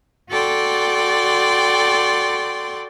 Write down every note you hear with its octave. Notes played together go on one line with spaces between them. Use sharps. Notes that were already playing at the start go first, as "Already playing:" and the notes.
F#4 A4 D5 G5 C6